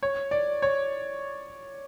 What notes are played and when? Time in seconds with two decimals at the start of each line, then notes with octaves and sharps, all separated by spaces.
0.03 C#5
0.31 D5
0.62 C#5